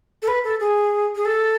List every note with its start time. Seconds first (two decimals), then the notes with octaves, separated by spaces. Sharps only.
0.22 A4
0.28 B4
0.44 A4
0.60 G#4
1.15 G#4
1.25 A4